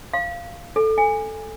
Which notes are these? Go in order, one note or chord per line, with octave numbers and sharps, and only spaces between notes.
F5
A4
G#5